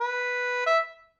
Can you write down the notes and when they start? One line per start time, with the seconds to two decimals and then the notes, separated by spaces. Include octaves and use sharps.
0.01 B4
0.66 E5